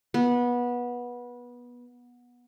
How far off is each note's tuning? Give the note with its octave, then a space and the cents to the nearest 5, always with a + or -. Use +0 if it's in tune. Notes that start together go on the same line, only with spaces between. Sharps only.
B3 -20